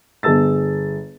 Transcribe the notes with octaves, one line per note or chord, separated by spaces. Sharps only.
G1 G#4 A5 E6 A6